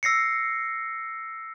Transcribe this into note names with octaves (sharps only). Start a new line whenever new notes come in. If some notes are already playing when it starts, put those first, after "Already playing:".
E6 A#6 C7 C#7